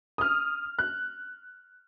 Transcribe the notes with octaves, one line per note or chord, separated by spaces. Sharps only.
D#6 F6
F#6